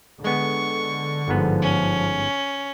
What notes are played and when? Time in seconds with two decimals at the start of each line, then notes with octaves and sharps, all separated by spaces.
0.24 D3 G#3 B3 C#6
1.28 G1 G#2 F3 B3
1.62 C#4